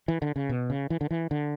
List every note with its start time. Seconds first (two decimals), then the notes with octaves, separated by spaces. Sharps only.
0.08 E3
0.22 D3
0.36 C#3
0.49 B2
0.70 C#3
0.90 E3
1.01 D3
1.11 E3
1.31 D3